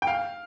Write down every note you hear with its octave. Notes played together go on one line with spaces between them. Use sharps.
G5
F5